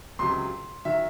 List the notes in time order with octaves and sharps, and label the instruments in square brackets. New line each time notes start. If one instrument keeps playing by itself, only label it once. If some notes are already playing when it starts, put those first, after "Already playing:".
[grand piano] C#2 C3 F#3 C6
D#3 F#3 E5